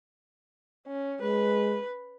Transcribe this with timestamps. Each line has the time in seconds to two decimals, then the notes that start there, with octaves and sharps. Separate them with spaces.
0.87 C#4
1.22 G#3 B4